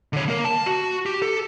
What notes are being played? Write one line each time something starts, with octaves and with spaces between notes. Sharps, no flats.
D3 C#5
A#3 A#4
A5
F#4
G4
A4